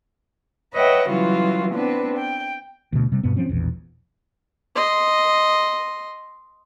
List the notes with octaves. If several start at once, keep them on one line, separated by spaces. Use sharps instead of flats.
B4 C#5 D#5 E5 F#5 G5
C#3 E3 F#3 G3 F4 F#4
B3 C4 D4 B4
G5
D2 B2
C3 G3
G2 B2 B3
F3 C4 C#4
E1 A#1 E2
D#5 C6